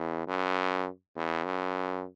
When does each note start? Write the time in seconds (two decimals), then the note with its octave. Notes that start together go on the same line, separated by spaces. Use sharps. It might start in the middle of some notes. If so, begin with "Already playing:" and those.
Already playing: E2
0.27 F#2
1.16 E2
1.44 F#2